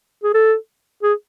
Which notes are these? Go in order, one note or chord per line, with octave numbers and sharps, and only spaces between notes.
G#4
A4
G#4